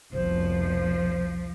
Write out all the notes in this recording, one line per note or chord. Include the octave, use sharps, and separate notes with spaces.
F1 C2 B2 F3 C5